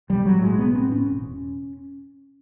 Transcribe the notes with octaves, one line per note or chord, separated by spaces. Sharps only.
B1 G3
F#3
A2
G#3
B1 B3
C4
A2
C#4
E1